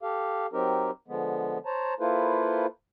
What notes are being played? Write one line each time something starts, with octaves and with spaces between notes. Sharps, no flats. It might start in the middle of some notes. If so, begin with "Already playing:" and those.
G4 A4 F5
F#3 C4 D#4 G4 A#4
D3 F3 G#3 B3
C5 C#5 A5 A#5
A#3 E4 F4 A4 B4 C5